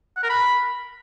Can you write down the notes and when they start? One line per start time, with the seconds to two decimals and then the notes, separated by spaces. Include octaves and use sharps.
0.17 F#5
0.23 A#4
0.29 B5